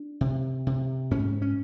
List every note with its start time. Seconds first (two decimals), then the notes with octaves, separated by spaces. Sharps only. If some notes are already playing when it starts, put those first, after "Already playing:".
Already playing: D4
0.21 C3
0.67 C3
1.11 G#2 C#4
1.42 C#4